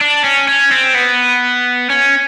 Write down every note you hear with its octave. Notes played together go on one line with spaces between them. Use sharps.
D4
C#4
C#4
C4
B3
C#4